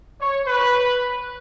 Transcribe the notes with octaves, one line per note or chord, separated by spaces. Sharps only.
C#5
B4